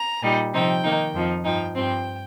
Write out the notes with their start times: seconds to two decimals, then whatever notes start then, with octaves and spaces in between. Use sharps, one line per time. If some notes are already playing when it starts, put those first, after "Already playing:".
Already playing: A#5
0.22 A#2 G3 D#4
0.53 C3 F3 C4 D#4 G5
0.83 D#3 A#3 D#4
1.14 F2 F3 D#4
1.44 G2 F3 D#4 G5
1.75 G2 F3 C4 G5